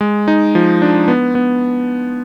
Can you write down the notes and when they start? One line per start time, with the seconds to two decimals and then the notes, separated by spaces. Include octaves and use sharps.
0.01 G#3
0.28 D#4
0.55 F3
0.82 D4
1.08 B3
1.35 B3